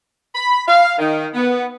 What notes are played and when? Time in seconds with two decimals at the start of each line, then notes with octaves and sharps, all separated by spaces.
0.35 B5
0.68 F5
0.99 D#3
1.34 B3